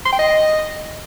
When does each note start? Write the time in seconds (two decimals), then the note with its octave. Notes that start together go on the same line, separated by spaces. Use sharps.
0.06 C6
0.12 G5
0.19 D#5